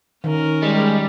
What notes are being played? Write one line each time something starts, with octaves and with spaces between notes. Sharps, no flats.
D#3 C#4 A#4
G3 G#3